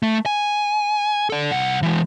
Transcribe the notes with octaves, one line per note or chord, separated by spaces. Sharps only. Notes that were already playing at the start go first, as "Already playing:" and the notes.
A3
G#5
A4 D5
C2 F#5
E3 G#3